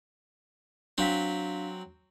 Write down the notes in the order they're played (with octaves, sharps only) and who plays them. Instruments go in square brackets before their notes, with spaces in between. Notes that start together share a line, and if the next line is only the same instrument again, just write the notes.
[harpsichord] F#3 C4 [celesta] D4 F5 B6